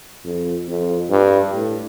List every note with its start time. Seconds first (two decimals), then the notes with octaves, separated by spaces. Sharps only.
0.25 F2
0.68 F2
1.10 G2
1.53 A2